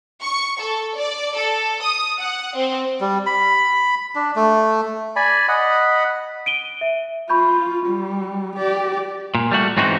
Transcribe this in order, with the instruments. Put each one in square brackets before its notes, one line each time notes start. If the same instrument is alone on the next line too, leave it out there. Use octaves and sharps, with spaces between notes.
[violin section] C#6
A4
D5
A4
D#6
F#5
C4
[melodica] G3
B5
D4
A3
D5 G#5 B5
D#5 F#5 B5
[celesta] D7 D#7 G7
E5
[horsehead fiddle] F4 [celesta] B5 C#6 G6
[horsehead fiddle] G3
G4 D5
[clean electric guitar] A#2
G3 A3 F#4
G#2 E3 C4 C#4 D#4 F#4